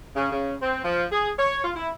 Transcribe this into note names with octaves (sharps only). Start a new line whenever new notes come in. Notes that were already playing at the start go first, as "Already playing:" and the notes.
C#3
C#3
C4
F3
G#4
C#5
F4
E4